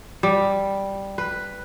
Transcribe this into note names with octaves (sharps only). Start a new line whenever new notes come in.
G3
B4